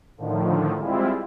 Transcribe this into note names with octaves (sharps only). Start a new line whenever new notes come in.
A2 D3 D#3 F3
G3 G#3 C4 E4 F4